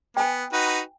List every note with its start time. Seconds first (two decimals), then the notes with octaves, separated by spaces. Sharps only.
0.17 B3 G5 G#5
0.53 D#4 F#4 B4